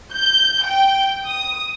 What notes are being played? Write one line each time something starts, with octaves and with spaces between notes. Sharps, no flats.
G6
G5
D#6